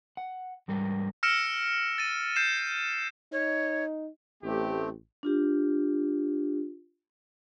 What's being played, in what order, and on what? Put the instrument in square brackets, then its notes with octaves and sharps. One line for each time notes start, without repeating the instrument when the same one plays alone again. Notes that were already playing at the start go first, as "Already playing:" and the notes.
[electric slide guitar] F#5
G#2 G3 A#4
[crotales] E6 F6 A#6 C#7 D7 E7
A6 D#7
G6 C7 D#7 E7
[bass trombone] D#4 [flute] C#5
[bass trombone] A1 [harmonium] A3 C4 [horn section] G4
[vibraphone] D4 F4 G4